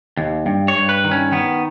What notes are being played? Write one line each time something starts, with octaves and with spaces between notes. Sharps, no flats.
D#2
G2
C#5
G2
B4
D#3
C#4
D#3 B3